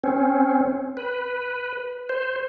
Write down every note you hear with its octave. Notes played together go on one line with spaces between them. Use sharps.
C4 C#4
B4
C5